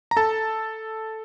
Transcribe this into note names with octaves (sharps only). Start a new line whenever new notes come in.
A#5
A4 A5